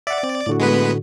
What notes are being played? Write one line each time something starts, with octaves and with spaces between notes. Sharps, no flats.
D5 E5 F#5
C4
A2 D3 F#4
G#3 B3 B4